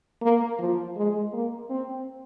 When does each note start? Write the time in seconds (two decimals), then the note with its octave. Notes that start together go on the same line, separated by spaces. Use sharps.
0.22 A#3
0.59 F3
0.97 G#3
1.33 A#3
1.70 C4